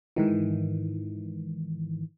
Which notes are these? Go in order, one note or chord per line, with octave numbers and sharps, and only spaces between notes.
G#2 D#3 E3